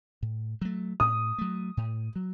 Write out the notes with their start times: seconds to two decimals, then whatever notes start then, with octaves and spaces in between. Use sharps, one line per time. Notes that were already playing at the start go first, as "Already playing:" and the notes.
0.23 A2
0.62 F#3 A3
1.00 A2 D#6
1.38 F#3 A3
1.77 A2
2.16 F#3